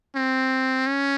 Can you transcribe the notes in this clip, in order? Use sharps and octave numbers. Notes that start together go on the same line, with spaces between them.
C4
C#4